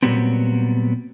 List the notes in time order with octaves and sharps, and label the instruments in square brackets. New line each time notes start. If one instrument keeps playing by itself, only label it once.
[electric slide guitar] A#2 D#3 F#3 G3 B3 C4